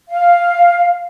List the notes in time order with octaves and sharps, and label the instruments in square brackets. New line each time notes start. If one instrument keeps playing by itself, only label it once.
[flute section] F5